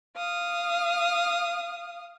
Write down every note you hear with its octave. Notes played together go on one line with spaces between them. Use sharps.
F5 D#6